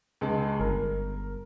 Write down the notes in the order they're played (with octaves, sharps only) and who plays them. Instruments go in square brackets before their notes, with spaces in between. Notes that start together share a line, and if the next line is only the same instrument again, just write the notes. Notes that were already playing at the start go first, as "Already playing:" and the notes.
[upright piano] C#2 G#3 A5
[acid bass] G1 [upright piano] A#4